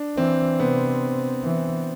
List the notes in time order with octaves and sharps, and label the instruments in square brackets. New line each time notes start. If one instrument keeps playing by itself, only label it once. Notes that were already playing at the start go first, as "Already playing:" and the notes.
Already playing: [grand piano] D4
[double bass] E3 [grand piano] C4
[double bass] C3 [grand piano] B3
[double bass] E3